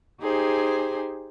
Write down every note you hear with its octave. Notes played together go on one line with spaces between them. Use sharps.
D#4 G4 G#4 C5 G#5